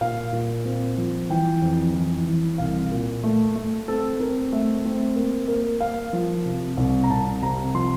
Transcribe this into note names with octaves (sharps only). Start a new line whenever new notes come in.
A#2 F5
A#2
C4
F3
E3 G5
F2
E3
E3
C2 F5
A#2
A3
A3
C4 A4
C4 A#4
A3 E5
C4
A#3
A#3
A#3 F5
F3
C3
C2
A#5
C2 A5
C3 A#5
F3 C6